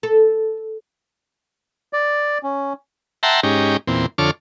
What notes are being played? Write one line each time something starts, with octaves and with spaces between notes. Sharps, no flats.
A4
D5
C#4
E5 F#5 G5 A5 A#5 C6
G#2 C#4 D#4 G4
E2 A#2 C4
F2 D3 A4 C#5 D6 F6